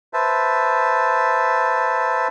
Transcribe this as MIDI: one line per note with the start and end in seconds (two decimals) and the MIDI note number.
0.13 2.28 71
0.13 2.28 72
0.13 2.28 76
0.13 2.28 81